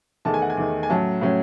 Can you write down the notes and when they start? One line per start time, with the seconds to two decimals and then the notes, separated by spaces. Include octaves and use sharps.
0.25 E2 D#3 A3 A5
0.34 G#5
0.42 F#5
0.50 G#5
0.57 E2 D#3 A3
0.83 G#5
0.90 A2 F#3 C#4 A5
1.21 A2 F#3 C#4